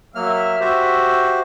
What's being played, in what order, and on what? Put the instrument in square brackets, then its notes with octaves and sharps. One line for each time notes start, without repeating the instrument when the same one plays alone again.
[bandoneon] F#3 A#3 F6 [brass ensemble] E5
[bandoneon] F#4 G4 C5